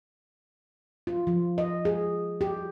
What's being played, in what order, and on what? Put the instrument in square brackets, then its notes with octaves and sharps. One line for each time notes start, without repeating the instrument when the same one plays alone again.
[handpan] F4
F3
D#5
G#4
G4